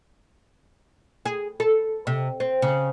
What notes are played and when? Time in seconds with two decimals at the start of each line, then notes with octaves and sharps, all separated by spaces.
1.25 G#4
1.60 A4
2.07 C3
2.40 C4
2.62 C#3